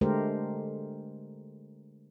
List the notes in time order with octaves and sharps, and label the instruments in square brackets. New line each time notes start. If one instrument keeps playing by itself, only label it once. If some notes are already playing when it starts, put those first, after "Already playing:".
[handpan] D3 G#3 A3 G4 A#4 C5